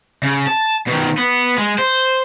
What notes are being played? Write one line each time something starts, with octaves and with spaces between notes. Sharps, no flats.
C#3
A5
B2 D#3
B3
G#3
C5